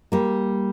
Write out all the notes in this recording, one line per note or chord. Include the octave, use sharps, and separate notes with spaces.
G3 A#3